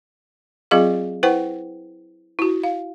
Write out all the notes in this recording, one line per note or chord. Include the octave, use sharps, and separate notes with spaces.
F#3 C4 F4 G#4 D#5 F5
E4 B4 C5 F#5 G5
E4 F#4
F5